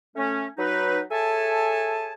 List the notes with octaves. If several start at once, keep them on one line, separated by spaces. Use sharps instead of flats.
A3 C#4
F#3 D#4 B4
G#4 A4 C#5 E5 G#5 A5